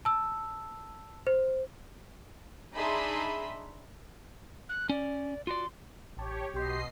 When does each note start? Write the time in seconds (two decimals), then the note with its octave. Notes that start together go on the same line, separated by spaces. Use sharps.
0.05 A5 E6
1.27 C5
2.75 D4 D#4 G#4 E5 B5 C6
4.69 F#6
4.89 C#4 D5
5.47 F4 F#4 D5 C6
6.17 A1 G4 C#5 A5
6.54 B1 B2 G4 D#5 C6 C7